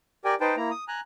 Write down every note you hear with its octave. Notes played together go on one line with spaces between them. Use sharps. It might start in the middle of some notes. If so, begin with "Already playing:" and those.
G4 A#4 D5 G5 G#5
D#4 B4 C5 G5 A5
A#3 E4 A#5
D#6
G#5 A#5 F#6